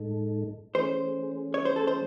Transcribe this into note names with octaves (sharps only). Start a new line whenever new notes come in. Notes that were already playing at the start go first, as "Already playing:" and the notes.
Already playing: A2 G#3 D#4 A4
E3 A3 C#4 G#4 C5
C#5
C5
A4
C5